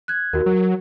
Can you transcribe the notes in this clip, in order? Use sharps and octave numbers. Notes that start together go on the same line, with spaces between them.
F#6 G#6
D#2 F#4 A#4
F#3